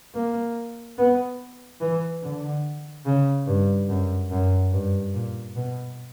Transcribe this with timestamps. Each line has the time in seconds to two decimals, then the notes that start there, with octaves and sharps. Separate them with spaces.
0.15 A#3
0.98 B3
1.81 E3
2.23 D3
3.06 C#3
3.47 G2
3.89 F#2
4.31 F#2
4.73 G2
5.14 A#2
5.56 B2